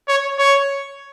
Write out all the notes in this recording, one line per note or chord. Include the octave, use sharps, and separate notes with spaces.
C#5
C#5